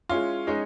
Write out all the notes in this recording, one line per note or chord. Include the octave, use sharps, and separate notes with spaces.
G#3 C#4 E4 F4
G#3 C#4 D#4